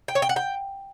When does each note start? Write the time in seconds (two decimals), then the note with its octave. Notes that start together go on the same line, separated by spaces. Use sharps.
0.08 G5
0.15 C#5
0.22 G5
0.29 F#5
0.36 G5